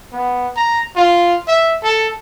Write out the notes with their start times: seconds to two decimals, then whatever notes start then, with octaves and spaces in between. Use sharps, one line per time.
0.12 B3
0.56 A#5
0.96 F4
1.48 E5
1.83 A4